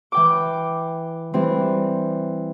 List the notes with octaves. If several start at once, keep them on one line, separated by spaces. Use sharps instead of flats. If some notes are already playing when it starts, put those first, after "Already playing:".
E3 G5 D6
E3 G3 C4